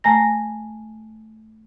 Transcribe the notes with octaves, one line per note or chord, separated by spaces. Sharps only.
A3 G#5 A#5 A#6